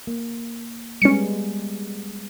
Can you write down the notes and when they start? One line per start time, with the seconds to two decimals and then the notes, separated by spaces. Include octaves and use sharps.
0.07 A#3
1.02 G3 G#3 B3 C#4 C#7